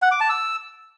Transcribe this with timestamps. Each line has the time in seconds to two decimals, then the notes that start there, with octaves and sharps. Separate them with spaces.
0.02 F#5
0.11 D6
0.20 A5
0.30 E6